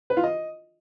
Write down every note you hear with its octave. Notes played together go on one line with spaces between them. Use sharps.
B4
F4
D#5